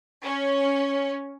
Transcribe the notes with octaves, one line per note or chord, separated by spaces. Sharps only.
C#4